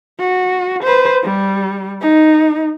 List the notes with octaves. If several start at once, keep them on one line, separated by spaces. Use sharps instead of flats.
F#4
B4 C5
G3
D#4